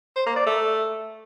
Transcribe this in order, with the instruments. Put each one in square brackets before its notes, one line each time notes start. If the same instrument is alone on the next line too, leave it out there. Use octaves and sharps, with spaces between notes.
[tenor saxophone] C5
A#3
D5
A3